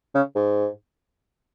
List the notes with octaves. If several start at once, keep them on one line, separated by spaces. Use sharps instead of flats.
C#3
G#2